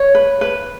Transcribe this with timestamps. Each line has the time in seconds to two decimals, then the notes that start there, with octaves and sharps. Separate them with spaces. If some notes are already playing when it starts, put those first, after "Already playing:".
Already playing: C#5
0.15 B4
0.41 B4